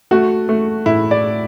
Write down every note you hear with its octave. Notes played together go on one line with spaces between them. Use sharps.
A3 F#4
A3
A2 E4
D5